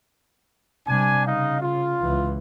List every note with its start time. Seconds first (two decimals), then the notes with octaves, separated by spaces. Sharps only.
0.88 C3 G3 D4 G#5
1.27 C#3 D#4 D#5 F5
1.61 F4
2.02 C#2 E3